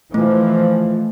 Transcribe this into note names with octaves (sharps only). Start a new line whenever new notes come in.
E3 F3 A3